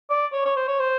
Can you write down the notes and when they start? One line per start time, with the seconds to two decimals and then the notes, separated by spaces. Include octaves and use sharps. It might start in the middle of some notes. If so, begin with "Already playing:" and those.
0.10 D5
0.32 C#5
0.45 C#5
0.56 C5
0.68 C#5
0.79 C5